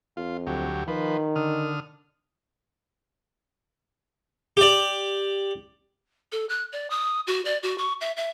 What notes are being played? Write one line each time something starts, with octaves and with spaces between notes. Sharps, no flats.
F2 F4
D2 F#3 G4
D#3 F3 B4
D3 D#6 F6
G4 D5
A4
F#6
D5
D#6
F#4
D5
F#4
C#6
E5
E5